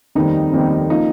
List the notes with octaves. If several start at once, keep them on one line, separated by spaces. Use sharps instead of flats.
F1 D#2 D#3 G3 C4 D#4
F1 D#2 D#3 G3 C4
F3 A#3 D#4